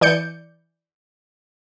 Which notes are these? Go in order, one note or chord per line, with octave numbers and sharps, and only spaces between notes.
E3 D5 G6 C#7